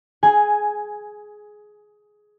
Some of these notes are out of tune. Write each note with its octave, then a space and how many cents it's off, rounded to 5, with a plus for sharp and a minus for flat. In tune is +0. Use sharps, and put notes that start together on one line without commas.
G#4 +15 G#5 +0